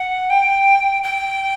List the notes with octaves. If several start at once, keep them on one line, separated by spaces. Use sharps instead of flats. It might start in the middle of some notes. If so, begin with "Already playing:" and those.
Already playing: F#5
G5
G5